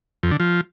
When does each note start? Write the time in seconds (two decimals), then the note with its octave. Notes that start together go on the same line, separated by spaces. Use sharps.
0.23 F2
0.31 D3
0.40 F3